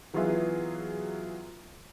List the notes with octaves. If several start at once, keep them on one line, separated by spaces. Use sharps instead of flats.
E3 F#3 B3 F4 G#4 E5